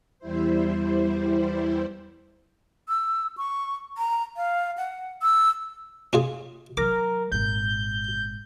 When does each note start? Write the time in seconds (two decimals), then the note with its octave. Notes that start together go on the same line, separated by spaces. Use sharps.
0.19 E2 G3 E4 C5
2.88 E6
3.37 C#6
3.98 A#5
4.37 F5
4.77 F#5
5.22 E6
6.13 C#4 F4 G#4
6.77 D#3 F#3 A#4 D6
7.32 G#1 A#2 G6